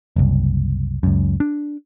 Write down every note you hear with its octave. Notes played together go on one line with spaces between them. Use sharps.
F#1 C2
C#2 F#2
D4